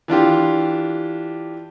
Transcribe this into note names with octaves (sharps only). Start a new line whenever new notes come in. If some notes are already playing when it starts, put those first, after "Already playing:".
E3 D4 F4 G4